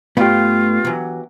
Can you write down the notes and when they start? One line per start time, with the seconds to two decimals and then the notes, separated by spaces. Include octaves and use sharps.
0.17 G2 A3 B3 F4 G4 F5
0.85 E3 F#3